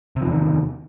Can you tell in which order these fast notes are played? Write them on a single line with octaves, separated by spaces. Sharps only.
C3 F3 E2 D#3